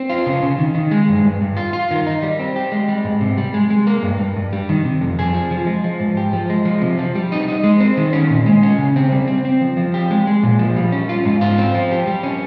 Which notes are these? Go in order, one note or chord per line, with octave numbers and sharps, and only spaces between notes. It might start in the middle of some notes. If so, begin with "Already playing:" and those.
Already playing: C4
F4
C#3
C#3
D#3
D#3
G#3
G2
G2
G2
F4
F4
D#3
D#4
G3
C4
G4
G#3
G3
G#2
C3
G3
G#3
G#3
A#3
G2
G2
G2
G3
D#3
C3
F2
G#4
F3
F3
G#3
F3
G#2
G4
F3
G#3
F3
C3
F3
G3
D#4
D#4
G#3
C4
D#3
C#4
A#2
G#3
C#4
C#3
C4
G3
C4
C4
F3
F3
G4
G#3
G#3
A#2
F3
G3
C#4
F4
G#2
F4
C4
F3
G4
G3
C#4